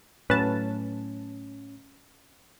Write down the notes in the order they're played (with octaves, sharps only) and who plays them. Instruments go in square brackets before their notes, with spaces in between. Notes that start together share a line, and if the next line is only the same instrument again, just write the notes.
[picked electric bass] A2 F#3 [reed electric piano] C#4 [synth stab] B4 A5